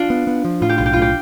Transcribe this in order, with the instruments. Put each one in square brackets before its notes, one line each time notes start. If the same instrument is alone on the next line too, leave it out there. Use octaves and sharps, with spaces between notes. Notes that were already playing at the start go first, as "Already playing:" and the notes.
Already playing: [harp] D4 F4
[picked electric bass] B3
B3
F3
[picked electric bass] A2 [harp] F4
[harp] G4
[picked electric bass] B1 [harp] F4
[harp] G4
[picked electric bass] A2 [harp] F4
[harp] G4